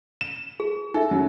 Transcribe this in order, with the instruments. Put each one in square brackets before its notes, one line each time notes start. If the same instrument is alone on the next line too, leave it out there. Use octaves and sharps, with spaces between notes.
[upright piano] E7
[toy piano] G#4
[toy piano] D#4 E5 [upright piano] A4
[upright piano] F#2 F#3